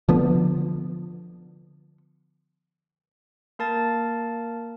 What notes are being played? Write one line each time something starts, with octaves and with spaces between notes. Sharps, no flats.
D3 F3 B3
A#3 A#4 A5 A6